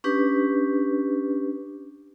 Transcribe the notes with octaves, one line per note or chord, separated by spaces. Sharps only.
C#4 D4 G4 B4